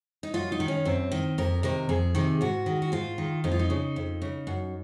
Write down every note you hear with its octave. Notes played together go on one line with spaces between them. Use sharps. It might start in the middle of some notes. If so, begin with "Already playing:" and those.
D#4
F#2 F4
D#4
D#3
C#4
F#2 C4
D#3
F2 A#4
C3 D#3 A#4
F2 G#4
C3 D#3
G#2 F#4
D#3
F#4
G#2 F4
D#3
F2 D#4
F4
D#4
C#3
F2
C#3
F#2